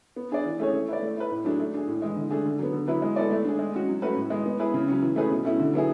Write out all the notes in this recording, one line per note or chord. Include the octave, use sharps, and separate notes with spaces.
B3
D4 G#4 D5
E3
A3 C#4 G#4 C#5
A3
E4 B4 D5
A3
E4 B4
A2
F#3 A3 D4 G#4
A3
D4 G#4
A2
E3 G#3
D3
A3 D4 G#4
D3
F#3 B3
D3
F#3 B3 E4 B4
G#3
B3 E4 A4 D5
A3
D4 G#4
G#3
C#4 F#4
F#3
A3 C#4 F#4 B4
A2
G#3 B3
B3
E4 G#4 B4
C#3
F#3 C#4
E3
A3 C#4 G#4 B4
B2
A3 C#4 E4
D3
F#3 B3 E4 G#4